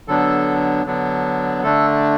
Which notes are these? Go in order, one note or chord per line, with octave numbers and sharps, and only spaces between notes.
D3 F#3 B3 D4 A4
D3 F#3 B3 D4
D3 A3 D4 A4